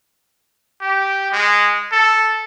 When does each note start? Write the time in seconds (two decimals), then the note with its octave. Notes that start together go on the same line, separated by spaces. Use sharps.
0.82 G4
1.32 G#3
1.92 A4